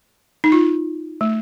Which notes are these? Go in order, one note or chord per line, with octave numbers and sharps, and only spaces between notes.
D#4
F4
A3